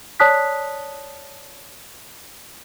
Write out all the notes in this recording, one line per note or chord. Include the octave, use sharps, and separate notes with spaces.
C#5 D5 A5 D#6 F#6 B6